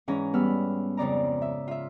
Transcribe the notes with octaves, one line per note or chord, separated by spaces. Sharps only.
G#2 E3 C#4 A#5
G3 B3 B4 B5 E6 F6
F2 C#3 D5 A#5
E5
F4 E5